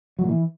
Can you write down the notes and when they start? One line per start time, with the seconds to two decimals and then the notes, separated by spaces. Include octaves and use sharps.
0.19 F#3
0.24 A#2
0.29 E3